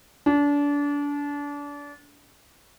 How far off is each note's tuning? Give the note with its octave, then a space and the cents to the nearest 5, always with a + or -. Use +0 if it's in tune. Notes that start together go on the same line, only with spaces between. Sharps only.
D4 -30